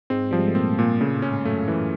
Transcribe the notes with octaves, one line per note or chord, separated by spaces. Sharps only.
G#2 G#3 C4
F3 G3
G#3
A3
A#2 A#3 C4
A#2
A2 C#3 A3
A2 A3
C#4
G#2 G#3
F#2 F#3 A3
E3